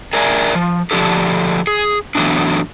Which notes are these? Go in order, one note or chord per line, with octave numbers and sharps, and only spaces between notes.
G#4 A#4 D5 E5 G5 G#5
F3
D3 F3 D4 F4 G4 A4
G#4
E3 F#3 A3 B3 D4